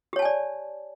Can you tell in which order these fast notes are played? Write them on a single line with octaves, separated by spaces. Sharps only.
G4 C#5 A5 G#5 D5